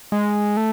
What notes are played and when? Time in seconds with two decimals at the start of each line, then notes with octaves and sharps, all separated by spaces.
0.12 G#3
0.57 A3